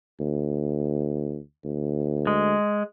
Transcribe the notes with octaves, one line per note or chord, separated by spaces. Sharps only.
D2
D2
G#3